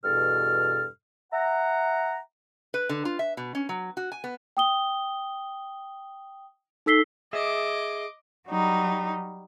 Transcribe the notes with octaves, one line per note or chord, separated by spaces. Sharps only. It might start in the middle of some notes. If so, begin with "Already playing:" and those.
E2 G2 B2 A4 F6
E5 F#5 A#5
B4
D3
F4
E5
B2
C#4
F#3
F#4
G#5
B3
G5 D#6 G7
D#4 A4 E6 B6 C7 G7
G#4 D#5 E5 D6
F#3 G3 D#4